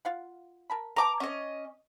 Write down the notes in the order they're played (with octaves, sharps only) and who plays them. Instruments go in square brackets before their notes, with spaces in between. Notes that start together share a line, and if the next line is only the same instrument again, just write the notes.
[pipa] F4 F5 F#5
A#4 A5 B5
[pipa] B4 G5 A5 [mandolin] A#5 D6
[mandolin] C#4 D#5